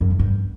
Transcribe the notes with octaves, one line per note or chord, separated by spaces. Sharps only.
F#2
D3
G2